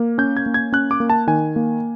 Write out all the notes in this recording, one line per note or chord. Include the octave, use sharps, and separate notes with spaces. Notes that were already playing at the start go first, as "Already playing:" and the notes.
Already playing: A#3
C#4 G6
G#6
A#3
G#6
C#4 F#6
D6
A#3
A5
D#3 G#5
A#3